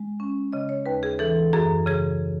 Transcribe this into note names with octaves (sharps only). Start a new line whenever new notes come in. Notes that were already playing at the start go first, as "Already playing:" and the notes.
Already playing: G#3
C#4
C#3 D#5
C#5
D#2 B4
G#4
E3 A4
F#2 G#4
C#3 G#4